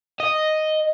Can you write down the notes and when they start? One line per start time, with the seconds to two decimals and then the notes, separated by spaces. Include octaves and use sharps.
0.20 D#5